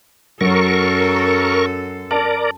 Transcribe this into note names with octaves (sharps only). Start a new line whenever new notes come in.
F#2 F#3 A4 A#4 C#6
A#4 D5 A5